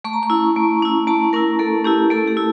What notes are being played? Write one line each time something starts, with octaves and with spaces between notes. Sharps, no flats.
A3 C#6
A#5
C#6
C#4 E4
A3
C#4 E4
A3 A5
C#4 E4 A#4
A3 A4
C#4 E4 G4
A3 A4
G4
E4